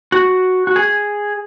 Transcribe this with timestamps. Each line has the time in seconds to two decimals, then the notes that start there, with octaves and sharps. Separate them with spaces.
0.12 F#4
0.67 F#4
0.76 G#4